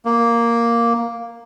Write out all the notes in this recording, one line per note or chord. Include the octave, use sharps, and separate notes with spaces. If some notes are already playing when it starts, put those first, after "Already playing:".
A#3